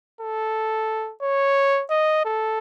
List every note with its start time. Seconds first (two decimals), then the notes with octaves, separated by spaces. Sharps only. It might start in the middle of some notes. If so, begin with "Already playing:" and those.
0.21 A4
1.22 C#5
1.90 D#5
2.25 A4